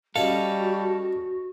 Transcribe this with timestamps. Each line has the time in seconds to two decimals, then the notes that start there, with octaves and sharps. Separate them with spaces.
0.16 G3 C#4 F#4 G#4 A4 D#5 F5